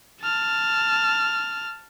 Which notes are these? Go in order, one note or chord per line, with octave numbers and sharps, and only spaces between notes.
A5 F6